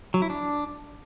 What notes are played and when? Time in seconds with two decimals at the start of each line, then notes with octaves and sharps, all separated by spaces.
0.14 F#3
0.22 E4
0.30 D4